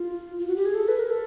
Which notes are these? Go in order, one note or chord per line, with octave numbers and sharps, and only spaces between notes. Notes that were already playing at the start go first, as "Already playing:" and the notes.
Already playing: F4
F4
F#4
G4
G#4
A4
B4
A#4
A4